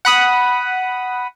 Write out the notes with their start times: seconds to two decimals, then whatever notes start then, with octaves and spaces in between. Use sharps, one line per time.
0.05 F#5 B5 D#6